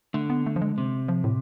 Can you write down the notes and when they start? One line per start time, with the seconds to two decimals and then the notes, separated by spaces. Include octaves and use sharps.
0.14 D3 A3
0.30 B3
0.46 A3
0.56 F3
0.61 G#3
0.78 C3
1.08 F3
1.24 A2